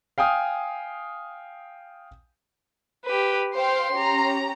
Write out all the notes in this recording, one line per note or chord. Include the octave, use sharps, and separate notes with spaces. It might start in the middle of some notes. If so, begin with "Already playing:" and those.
F5 G5 G#5 D#6 F6
G4 B4
C5 F5 G5 C6
C#4 G4 A#5